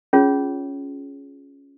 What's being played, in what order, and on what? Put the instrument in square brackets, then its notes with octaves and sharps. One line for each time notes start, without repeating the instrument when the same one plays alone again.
[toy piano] C#4 F4 G#4 C#5